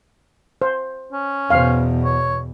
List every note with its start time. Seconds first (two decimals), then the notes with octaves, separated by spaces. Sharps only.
0.62 C5
1.13 C#4
1.50 E2 B2 C5 F5
2.05 C#5